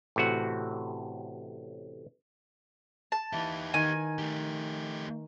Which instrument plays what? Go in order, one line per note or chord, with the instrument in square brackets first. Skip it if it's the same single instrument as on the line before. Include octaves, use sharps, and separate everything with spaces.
[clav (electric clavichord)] A1 A2 C3 F#4 F#5
[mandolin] A5
[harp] E3 [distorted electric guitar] D#4 G4
[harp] D#3 [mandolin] G#5
[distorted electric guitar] A3 G4